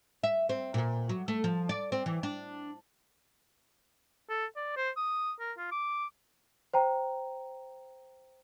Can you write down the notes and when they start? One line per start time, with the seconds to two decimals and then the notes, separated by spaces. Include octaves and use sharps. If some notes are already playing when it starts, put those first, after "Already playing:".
0.23 E5
0.49 C4
0.74 A#2
1.09 F#3
1.28 A3
1.44 F3
1.69 D5
1.92 C4
2.06 E3
2.23 D4
4.29 A4
4.56 D5
4.77 C5
4.97 D#6
5.40 A#4
5.58 F4
5.72 D6
6.74 C5 G5 A#5